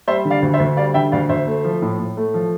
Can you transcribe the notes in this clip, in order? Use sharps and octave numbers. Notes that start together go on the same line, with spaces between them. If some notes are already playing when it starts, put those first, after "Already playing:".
G3 C5 E5
D3
D5 F5
D2
C5 E5
D2
G3 D5 F5
D3 E5 G5
D2 D5 F5
D2 C5 E5
A3
F3
A2
A2
A3
F3